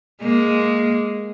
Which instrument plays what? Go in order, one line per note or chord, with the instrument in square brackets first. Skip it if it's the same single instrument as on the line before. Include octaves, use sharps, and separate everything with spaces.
[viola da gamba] G#3 A#3